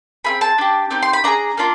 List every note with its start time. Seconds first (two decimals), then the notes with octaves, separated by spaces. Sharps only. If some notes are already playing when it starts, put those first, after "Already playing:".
0.24 C4 E4 G#4 B5
0.41 A5
0.58 D4 G4
0.91 C4 D#4 G4
1.02 C6
1.13 B5
1.24 D4 F4 G#4 A#5
1.57 A#3 D4 F4